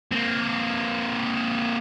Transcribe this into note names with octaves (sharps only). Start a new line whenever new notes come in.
A#3 C4